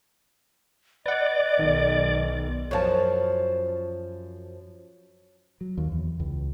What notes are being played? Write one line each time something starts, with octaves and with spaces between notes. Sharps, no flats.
B4 D5 D#5 F#5
B1 D#3
F#2 F3 C#5 A5
F#3
D#2
E2
C#2